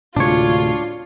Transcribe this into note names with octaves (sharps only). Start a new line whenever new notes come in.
D2 A2 C3 G#3 D4 F4 C#5